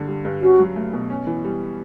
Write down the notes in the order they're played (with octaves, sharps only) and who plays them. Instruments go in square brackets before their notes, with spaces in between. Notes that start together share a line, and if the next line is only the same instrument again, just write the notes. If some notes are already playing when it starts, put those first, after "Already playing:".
Already playing: [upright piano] G2 D3
G3
G2
[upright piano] C#4 [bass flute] F#4
[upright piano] F#3
A3
B2
C#4
E3
G3